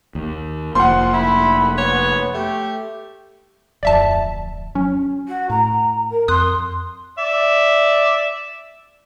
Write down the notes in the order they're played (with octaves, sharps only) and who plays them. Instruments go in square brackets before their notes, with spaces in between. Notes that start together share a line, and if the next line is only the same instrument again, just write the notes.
[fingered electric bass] D#2
[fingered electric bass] F1 A#3 [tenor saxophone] F3 [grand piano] F#5 C6
[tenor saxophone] E4 [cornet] B5
[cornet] B3 [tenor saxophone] C#5
[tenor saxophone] A3 [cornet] G4
[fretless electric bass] D1 F2 [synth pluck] D5 E5 A5
[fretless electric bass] F#3 [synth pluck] C#4
[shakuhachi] F#4
[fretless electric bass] A2 [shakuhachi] A#5
[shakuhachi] A#4
[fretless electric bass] F2 [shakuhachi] C6 [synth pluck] D#6 F#6
[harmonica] D5 E5